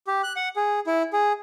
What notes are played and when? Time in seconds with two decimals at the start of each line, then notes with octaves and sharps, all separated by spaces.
0.07 G4
0.23 F#6
0.36 F#5
0.56 G#4
0.87 E4
1.13 G#4